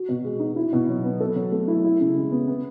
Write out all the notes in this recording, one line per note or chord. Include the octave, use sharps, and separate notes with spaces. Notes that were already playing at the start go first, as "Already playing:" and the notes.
Already playing: F#4
B2
G#3
D#4
E4
B2
F#3
B3
A4
F#3
A3
E4
E4
C#3
G#3
B3
B3